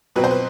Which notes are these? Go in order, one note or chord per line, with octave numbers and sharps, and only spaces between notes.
B2 F#3 C4 B4
C5
B4